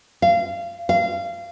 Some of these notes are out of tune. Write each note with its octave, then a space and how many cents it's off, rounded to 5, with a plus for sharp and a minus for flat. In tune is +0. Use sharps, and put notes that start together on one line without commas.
F5 -25
F5 -25